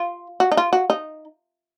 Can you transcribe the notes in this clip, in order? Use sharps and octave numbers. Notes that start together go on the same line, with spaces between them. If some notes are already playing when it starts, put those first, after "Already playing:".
Already playing: F4
F#4
D#4
F4
F#4
D#4